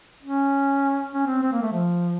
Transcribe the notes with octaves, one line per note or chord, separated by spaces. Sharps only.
C#4
C#4
C4
C4
A#3
A3
F3